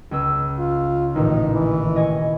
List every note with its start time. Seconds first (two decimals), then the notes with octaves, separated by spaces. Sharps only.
0.11 C#2 C#4 E6
0.58 F4
1.15 A1 A#2 D#3 D#4
1.52 E3
1.96 D#5 G#5 C#6